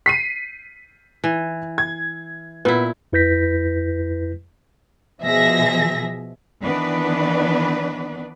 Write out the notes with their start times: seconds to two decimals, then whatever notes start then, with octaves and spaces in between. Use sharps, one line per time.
0.06 B6 C7 D#7
1.24 E3
1.78 G#6
2.65 A#2 B3 E4
3.13 F2 E4 B4 G6 A#6 B6
5.23 B2 F3 G#4 E5 A#6
6.61 D#3 E3 B3 D4 B4 D5